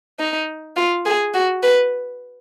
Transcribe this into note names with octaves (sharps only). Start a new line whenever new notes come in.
D#4
F4
G#4
F#4
B4